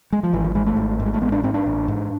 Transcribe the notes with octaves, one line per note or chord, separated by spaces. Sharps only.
G#3
F3
G#1 E3
F3
G#2 G#3
A3
G#1
G#2
G#3
A3
A1 B3
D4
G#2 C4
D4
A1
G#2